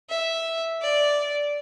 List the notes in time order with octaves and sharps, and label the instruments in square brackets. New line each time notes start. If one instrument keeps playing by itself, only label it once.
[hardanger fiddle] E5
D5